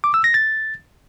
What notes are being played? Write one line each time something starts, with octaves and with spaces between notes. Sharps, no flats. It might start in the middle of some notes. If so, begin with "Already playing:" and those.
D6
E6
A#6
A6